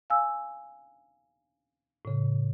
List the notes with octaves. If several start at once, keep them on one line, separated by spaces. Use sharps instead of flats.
F5 G#5 E6
A2 C#3